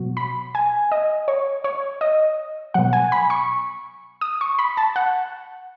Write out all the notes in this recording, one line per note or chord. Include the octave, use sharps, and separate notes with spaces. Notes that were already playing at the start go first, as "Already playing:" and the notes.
Already playing: B2 F#3
B5
G#5
D#5
C#5
C#5
D#5
B2 F#3 F#5
G#5
B5
C#6
D#6
C#6
B5
A5
F#5